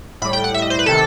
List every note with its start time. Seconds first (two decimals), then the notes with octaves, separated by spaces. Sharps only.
0.22 A2 B5
0.25 G3
0.33 G5
0.44 F#5
0.54 E5
0.62 D#5
0.70 C5
0.79 B4
0.86 C3 D#3 A4